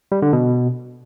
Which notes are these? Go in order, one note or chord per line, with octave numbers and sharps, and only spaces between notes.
G3
D3
B2